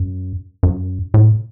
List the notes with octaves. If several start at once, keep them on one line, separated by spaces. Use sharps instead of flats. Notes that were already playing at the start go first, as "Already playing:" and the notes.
Already playing: F#2
F#2
A2